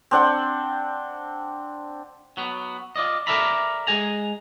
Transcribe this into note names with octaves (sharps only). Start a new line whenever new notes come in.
C4 D4 F#5 G5
F#3 B3
F4 D5 D#5
A4 A#4 D5 E5 A#5 B5
G#3 G#4 G#5 A#5